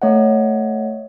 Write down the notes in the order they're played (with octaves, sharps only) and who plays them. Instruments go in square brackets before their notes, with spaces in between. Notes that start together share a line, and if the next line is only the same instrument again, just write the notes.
[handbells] A3 C#5 D#5 F#5